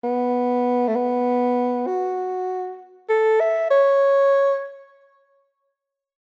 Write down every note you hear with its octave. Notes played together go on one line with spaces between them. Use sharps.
B3
A3
B3
F#4
A4
E5
C#5